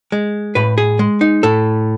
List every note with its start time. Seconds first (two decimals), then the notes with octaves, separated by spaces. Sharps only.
0.12 G#3
0.55 A2 B4
0.78 G#4
0.99 G#3
1.21 D#4
1.43 A2 A4